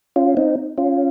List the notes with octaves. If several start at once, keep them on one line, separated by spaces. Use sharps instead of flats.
C#4 F4
C4 D#4
C#4 F4